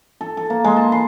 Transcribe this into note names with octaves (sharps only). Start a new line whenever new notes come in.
A4
A4
A#3
G#3
A5
C6